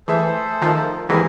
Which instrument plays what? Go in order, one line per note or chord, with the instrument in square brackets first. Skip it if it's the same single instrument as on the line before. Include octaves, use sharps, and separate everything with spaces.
[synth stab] E3 [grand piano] A3 G#4 E5 [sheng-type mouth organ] A4 C5
[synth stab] D#3 F3
[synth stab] D#2 G#2 E3 [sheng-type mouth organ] C4 G#4 A#4